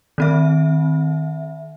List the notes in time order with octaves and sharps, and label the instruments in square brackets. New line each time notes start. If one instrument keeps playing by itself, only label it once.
[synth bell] D#3 C4 E5